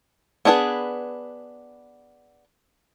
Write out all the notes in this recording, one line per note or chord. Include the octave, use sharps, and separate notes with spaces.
B3 D4 G#4 A4 B4